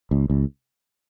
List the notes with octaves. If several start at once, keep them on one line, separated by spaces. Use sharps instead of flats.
C#2
C#2